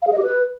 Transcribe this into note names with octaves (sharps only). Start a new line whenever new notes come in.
F5
G#4
D#5
G4
B4